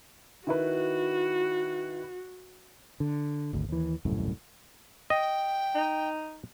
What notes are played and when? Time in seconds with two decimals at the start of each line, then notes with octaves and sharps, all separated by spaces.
0.47 D#3 E4 F#4 B4
3.00 D3
3.53 G#1 D2
3.69 D#2 E3
4.05 D#1 C2 F#2 A2
5.10 D#5 G5
5.75 D#4